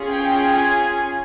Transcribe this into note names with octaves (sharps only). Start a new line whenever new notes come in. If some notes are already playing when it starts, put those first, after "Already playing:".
Already playing: C#4 F4 G#4
G5
G#5